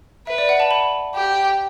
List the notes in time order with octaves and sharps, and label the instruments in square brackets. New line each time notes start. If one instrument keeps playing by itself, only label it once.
[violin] B4 [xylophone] E5
[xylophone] D5
F#5
A5
B5
[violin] G4